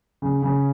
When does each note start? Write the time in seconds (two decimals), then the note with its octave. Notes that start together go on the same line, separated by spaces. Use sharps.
0.22 C#3
0.42 C#3